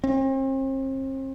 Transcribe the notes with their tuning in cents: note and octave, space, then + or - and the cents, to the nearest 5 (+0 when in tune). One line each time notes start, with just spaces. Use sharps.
C4 +40